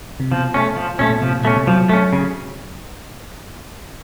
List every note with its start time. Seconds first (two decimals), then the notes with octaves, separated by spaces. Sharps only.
0.20 C3
0.32 B2 F3
0.54 A3 C#4
0.76 F3
0.99 A#2 A3 C#4
1.10 B2
1.22 C3 F3
1.33 A#2
1.44 B2 A3 C#4
1.56 C3
1.67 F3 F#3
1.89 A3 C#4
2.13 C#3